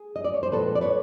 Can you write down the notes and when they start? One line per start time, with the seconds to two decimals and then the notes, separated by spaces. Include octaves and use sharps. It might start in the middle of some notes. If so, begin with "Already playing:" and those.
Already playing: G#4
0.16 D#5
0.25 D5
0.34 C#5
0.43 C5
0.52 A#2 F3 G#3 C4 A4 B4
0.75 D5
0.81 B4 C#5